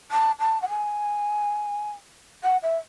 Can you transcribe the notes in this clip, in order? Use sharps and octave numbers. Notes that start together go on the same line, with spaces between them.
A5
A5
F#5
G#5
F#5
E5